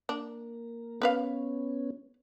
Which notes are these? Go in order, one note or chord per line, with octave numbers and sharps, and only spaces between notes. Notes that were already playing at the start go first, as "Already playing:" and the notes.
A#3 D4
B3 C#4 A#4 B4 F5